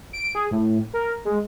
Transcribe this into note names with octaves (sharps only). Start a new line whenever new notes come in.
D7
G#4
A2
A#4
G#3